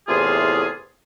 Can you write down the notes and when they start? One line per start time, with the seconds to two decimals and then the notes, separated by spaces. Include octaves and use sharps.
0.08 E2 A2 C3 F4 G#4